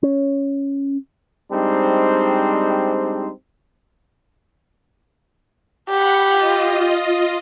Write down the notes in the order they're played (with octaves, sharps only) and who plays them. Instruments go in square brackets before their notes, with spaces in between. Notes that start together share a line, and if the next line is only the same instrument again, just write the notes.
[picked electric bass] C#4
[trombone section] G3 G#3 C4 D4 D#4 C5
[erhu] G4 [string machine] F#5 B5
[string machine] F4 D#5